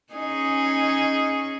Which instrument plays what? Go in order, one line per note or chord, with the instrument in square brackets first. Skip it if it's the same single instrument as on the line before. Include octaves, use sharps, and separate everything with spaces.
[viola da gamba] C#4 D#4 G#4